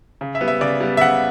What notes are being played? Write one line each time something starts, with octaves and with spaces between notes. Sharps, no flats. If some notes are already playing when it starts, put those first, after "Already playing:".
C#3
E5
G3 B3
E5
C#3 D5
G3 B3
E5
C#3 F#5